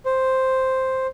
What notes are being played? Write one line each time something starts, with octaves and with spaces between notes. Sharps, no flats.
C5